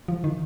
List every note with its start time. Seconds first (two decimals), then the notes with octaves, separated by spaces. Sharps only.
0.08 F3
0.24 D#3